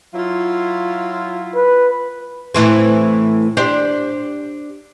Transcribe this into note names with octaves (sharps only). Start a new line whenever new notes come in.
F#3 E4 F4
B4
A2 E3 C4
D4 G4 C5